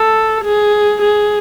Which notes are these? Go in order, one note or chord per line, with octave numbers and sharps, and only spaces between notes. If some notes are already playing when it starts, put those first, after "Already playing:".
Already playing: A4
G#4
G#4